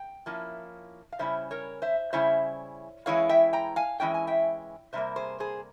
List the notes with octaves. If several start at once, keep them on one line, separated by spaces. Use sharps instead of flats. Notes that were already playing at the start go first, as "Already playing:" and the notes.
Already playing: G5
F3 A#3 C#4 E4
F5
C#3 G3 C#4 E4 C5 E5
A#4 C#5
C5 E5
C#3 G3 C#4 E4 C5 E5
E3 G#3 C#4 E4 C#5 F5
E5 G5
G5 A#5
F5 G#5
E3 G#3 C#4 E4 G5
G#5
E5 G5
C3 G3 A#3 C5 E5
G#4 C5
G#4 C5